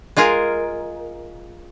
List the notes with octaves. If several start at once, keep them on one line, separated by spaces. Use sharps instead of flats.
G#3 F4 G#4 A#4